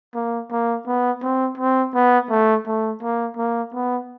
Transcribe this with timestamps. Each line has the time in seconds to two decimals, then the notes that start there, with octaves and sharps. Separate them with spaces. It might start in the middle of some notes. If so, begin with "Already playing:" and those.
0.15 A#3
0.51 A#3
0.87 B3
1.23 C4
1.58 C4
1.94 B3
2.30 A3
2.66 A3
3.02 A#3
3.37 A#3
3.74 B3